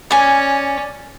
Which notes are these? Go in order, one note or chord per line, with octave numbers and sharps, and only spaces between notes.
C#4 D5 G#5